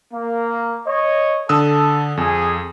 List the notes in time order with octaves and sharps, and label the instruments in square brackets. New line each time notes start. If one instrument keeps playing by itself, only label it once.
[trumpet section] A#3
C#5 D#5
[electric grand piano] D3 D#6 E6 [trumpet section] A4
[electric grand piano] F2 [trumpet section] G#4 G#5